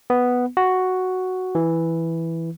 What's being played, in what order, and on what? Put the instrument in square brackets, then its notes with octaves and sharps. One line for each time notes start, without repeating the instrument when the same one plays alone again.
[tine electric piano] B3
F#4
E3